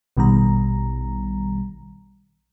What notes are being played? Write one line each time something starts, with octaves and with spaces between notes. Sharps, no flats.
A#1 B2 D#3 G3 A#5